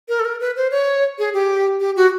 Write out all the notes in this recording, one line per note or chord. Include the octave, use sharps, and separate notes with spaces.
A#4
A4
A#4
B4
C5
C#5
G#4
G4
G4
F#4